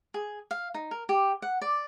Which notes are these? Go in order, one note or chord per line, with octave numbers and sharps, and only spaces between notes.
G#4
F5
D#4
A#4
G4
F#5
D5